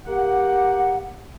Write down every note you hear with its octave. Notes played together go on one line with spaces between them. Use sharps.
A#3 G4 F#5